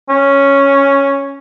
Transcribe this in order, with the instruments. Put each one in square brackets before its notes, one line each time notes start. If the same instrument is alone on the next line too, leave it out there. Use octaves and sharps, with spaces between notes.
[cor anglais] C#4